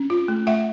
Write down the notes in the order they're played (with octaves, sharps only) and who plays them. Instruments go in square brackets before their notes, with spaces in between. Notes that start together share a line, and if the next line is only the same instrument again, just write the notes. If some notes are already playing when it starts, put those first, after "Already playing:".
Already playing: [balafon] C#4
F4
A3
A3 E5 F#5